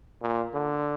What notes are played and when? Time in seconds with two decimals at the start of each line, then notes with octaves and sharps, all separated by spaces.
0.22 A#2
0.54 D3